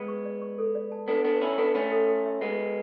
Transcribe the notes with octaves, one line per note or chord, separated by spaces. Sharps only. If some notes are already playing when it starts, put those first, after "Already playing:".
Already playing: G#3 B3
C#6
D5
C#6
A4
D5
A5
B3 D4 A4
B3 D4 A4
C#4 E4 B5
B3 D4 A4
A3 C#4 B5
A4
A4
E5
G#3 B3 F#4
F#4